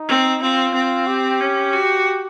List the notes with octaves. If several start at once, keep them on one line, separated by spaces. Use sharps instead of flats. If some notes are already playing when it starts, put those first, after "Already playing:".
Already playing: D#4
C4
C4 F4
C4
G4
C#4
F#4